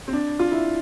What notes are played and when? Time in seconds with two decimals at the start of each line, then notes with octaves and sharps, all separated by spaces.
0.08 C4
0.13 D4
0.39 F4
0.52 E4